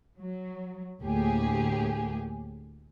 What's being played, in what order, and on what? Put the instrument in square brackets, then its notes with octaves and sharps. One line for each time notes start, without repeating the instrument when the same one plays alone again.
[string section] F#3
D2 A2 A#3 G4 G#4